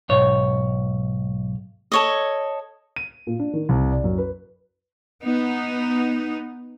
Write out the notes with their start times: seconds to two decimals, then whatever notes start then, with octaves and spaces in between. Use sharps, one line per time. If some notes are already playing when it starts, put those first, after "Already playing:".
0.09 B1 G#2 C#5
1.92 A4 C#5 D#5
2.96 D#7
3.27 A#2
3.39 D4
3.53 D#3
3.69 C2
3.92 D5
4.04 F#2
4.18 B4
5.24 B3 D#4